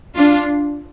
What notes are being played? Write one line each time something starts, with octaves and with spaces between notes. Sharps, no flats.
D4 F4